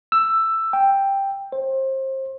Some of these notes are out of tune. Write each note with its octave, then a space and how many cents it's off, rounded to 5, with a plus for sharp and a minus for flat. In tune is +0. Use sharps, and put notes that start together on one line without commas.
E6 +10
G5 +5
C5 +30